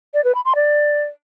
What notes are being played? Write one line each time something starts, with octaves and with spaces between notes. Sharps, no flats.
D5
B4
B5
C6
D5